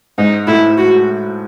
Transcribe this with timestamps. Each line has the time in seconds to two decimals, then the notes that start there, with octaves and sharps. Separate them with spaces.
0.18 G#2 D#4
0.47 A2 E4
0.77 F#4